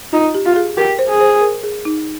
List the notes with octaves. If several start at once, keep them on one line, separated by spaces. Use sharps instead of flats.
D#4 F4
G4
F4
G#4
G4 A#4
C5
G#4
C5
A#4
G#4
D#4